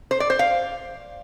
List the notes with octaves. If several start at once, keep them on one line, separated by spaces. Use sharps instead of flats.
C5
D5
C5
F5